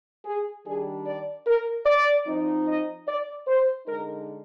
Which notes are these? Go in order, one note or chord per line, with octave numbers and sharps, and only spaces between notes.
G#4
D#3 G3 D4 G#4
D5
A#4
D5
F3 C4 D#4
D#5
D5
C5
D3 G#3 D#4 A#4